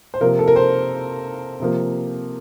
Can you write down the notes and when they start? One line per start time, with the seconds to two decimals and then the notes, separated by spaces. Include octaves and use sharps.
0.14 C5
0.21 C3 F3 A#3 A#4
0.39 A4
0.48 A#4
0.56 C5
1.60 C3 F3 A#3